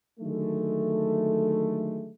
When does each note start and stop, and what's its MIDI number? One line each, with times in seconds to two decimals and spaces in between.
0.20 2.10 50
0.20 2.10 51
0.20 2.10 54
0.20 2.10 56
0.20 2.10 57